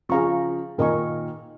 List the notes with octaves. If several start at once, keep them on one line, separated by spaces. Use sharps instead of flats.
C#3 F3 G#4 F5 A#5 C#6
A#2 D#3 A#4 D#5 G#5 C#6